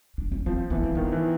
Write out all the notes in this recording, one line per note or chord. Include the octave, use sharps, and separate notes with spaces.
D4
C#4
F3 C4
E3 B3
C4
D#3 B3
E3